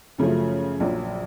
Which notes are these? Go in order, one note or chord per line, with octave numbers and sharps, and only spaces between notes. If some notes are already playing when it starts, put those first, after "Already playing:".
F#2 C#3 F3 A3
A#1 A#2 F#3